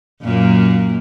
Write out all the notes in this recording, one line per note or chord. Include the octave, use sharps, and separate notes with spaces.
F#2 A#2 A#3